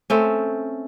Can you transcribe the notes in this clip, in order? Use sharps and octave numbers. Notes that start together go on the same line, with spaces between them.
A3 C4 C#4